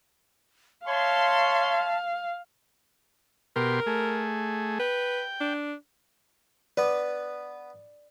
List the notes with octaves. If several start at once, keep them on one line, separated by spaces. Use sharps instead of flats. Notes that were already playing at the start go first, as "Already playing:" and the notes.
C#5 E5 F5 A5 C6
B2 G4 A#4 C6
A3 G#4
B4 G5
D4
B3 B4 D5